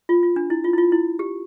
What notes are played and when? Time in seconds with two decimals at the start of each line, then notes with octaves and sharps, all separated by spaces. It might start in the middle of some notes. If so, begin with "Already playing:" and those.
0.09 F4
0.23 F4
0.36 D4
0.50 E4
0.64 F4
0.73 E4
0.78 F4
0.92 E4
1.19 G4